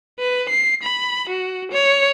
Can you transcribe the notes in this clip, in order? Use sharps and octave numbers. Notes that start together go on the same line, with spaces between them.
B4
C7
B5
F#4
C#5